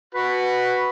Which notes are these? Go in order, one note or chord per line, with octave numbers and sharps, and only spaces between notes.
F#4 B4